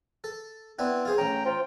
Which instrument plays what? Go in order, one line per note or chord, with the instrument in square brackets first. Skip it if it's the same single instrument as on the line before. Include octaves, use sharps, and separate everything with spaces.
[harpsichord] A4
[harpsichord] B3 D4 E4 [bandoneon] C4
[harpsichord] F4 G#4 C5
[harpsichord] A1 C#4 [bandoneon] G5 A#5
[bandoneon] F4 G5 [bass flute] C5